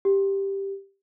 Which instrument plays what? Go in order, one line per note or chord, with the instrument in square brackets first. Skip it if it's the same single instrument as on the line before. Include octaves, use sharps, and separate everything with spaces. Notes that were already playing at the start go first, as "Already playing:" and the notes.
[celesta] G4